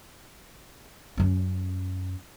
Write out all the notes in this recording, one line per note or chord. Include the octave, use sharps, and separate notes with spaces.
F#2 C#4